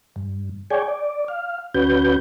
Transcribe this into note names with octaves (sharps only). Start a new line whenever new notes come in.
G2
G#4 C#5 D5 G5 G#5
D5
F5
D2 C#4 F#4 B4 G6